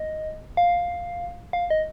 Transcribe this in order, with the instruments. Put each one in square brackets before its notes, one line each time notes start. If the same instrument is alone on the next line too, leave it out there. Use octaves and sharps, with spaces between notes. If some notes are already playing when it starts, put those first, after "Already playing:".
Already playing: [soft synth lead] D#5
F5
F5
D#5